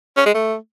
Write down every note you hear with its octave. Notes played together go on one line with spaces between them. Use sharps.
C#4
G#3
A3